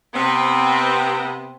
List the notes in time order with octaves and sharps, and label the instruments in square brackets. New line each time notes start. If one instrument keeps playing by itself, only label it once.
[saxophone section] C3 B3 [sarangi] C4